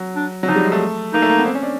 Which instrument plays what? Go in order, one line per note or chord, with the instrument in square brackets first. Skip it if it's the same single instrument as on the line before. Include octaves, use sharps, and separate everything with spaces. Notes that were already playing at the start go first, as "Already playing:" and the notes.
Already playing: [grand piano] F#3
[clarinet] D4
[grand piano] F#3
[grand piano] F3 [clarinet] D#4
[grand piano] G3
G#3
A3
[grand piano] A#3 [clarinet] D#4
[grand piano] A3
A#3
B3
C4
C#4
D4